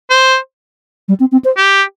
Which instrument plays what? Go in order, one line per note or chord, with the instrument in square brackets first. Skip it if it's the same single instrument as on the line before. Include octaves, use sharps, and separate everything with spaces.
[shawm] C5
[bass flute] G3
C4
C4
C5
[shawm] G4